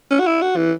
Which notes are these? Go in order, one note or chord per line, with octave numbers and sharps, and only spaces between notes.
C#4
F#4
E4
F#4
E3